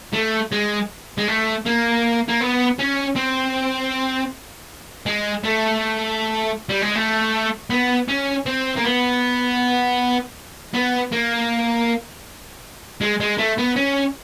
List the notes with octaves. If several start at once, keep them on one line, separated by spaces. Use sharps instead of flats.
A3
G#3
G#3
A3
A#3
A#3
B3
C#4
C4
G#3
A3
G3
G#3
A3
B3
C#4
C4
A#3
B3
B3
A#3
G#3
G#3
A3
B3
C#4